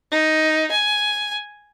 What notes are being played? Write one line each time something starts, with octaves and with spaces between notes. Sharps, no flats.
D#4
G#5